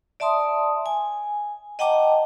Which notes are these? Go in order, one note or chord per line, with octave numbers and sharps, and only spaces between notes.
D5 E5 A5 C6 D#6
G#5
D#5 F#5 G5 A5 A#5 D6